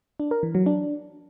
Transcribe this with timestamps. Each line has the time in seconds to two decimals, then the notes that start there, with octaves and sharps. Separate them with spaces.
0.20 D4
0.31 A#4
0.43 E3
0.55 F#3
0.66 D4